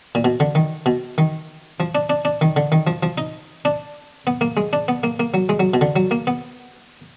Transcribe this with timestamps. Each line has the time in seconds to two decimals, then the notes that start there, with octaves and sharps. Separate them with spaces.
0.15 A#2
0.24 B2
0.40 D3
0.55 D#3
0.86 B2
1.18 D#3
1.80 F3
1.95 D4
2.10 D4
2.25 D4
2.41 D#3
2.56 D3
2.72 D#3
2.87 F3
3.03 F3
3.18 D#4
3.65 D4
4.27 B3
4.41 A#3
4.57 G#3
4.73 D4
4.88 B3
5.03 A#3
5.20 A#3
5.34 F#3
5.49 G#3
5.60 F#3
5.74 B2
5.81 D3
5.96 F#3
6.11 A#3
6.27 B3